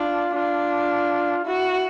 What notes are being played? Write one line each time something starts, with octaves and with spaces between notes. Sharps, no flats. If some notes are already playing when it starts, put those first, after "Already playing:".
Already playing: D4 F4
D4 F4
E4 F#4